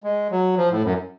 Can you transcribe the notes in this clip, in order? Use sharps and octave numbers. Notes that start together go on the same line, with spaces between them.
G#3
F#3
F3
A2
F#2